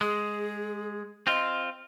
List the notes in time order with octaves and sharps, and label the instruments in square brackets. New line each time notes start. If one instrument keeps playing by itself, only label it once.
[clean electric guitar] G#3 [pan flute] G#4
[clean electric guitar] C4 F4 [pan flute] D#5